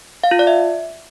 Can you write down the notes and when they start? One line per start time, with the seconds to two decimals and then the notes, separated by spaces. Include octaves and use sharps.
0.24 F5
0.31 F4
0.39 D5
0.47 E5